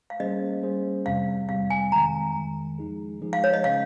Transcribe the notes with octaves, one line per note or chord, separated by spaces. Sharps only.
F5
G3 A#3 C#4 G#4 C5 D#5
G3 A#3 C#4 G#4 C5
F2 C3 G3 C4 F5
F2 C3 G3 C4 F5
G#5
F2 D#3 G#3 A#5
F2 D#3 G#3
F3 G#3 D#4 G#4
F3 G#3 D#4 G#4
F5
C#5
D#5
C#3 G#3 C#4 G#4 C#5 F5